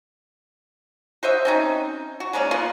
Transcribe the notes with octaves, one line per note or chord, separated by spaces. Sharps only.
F#4 C5 D#5 E5
C4 C#4 D#4
F#4
G#3 A#3 C#4 D5
A#3 B3 F4